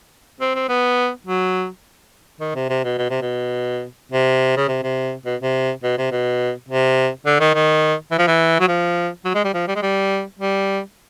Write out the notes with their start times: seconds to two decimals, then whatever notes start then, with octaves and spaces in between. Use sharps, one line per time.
0.41 C4
0.55 C4
0.69 B3
1.27 F#3
2.40 D#3
2.55 C3
2.69 C3
2.84 B2
2.98 B2
3.10 C3
3.22 B2
4.12 C3
4.57 C#3
4.68 C3
4.83 C3
5.26 B2
5.41 C3
5.83 B2
5.98 C3
6.11 B2
6.68 C3
7.26 D3
7.40 D#3
7.54 D#3
8.11 E3
8.18 F3
8.27 E3
8.60 F#3
8.68 F3
9.25 F#3
9.35 G#3
9.45 G3
9.54 F3
9.68 G3
9.75 G#3
9.82 G3
10.39 G3